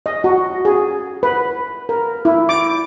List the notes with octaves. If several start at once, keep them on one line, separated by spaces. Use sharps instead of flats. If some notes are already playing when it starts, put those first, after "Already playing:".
D#5
F#4
G#4
B4
A#4
E4
D6